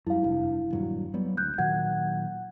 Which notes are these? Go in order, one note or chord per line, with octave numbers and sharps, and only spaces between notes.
F#2 G3 E4 F5
F1 G2
D#1 G2 F#3
F#3 G3 B3
D2 F#6 G6
A#2 D#3 F#3 F#5 G#6